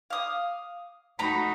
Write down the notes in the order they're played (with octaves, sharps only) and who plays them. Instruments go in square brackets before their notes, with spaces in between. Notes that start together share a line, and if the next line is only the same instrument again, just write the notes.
[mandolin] F5 D#6
[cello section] A3 D#4 F#4 [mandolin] A#5 B5